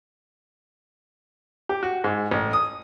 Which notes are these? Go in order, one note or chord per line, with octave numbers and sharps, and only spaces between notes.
G4
F#4
G#2
A1
D#6